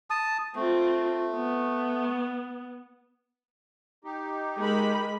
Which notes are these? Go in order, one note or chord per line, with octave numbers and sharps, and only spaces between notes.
A5 D#6
A3 C4 F4
B3
D#4 G4
G#3 A#4 B5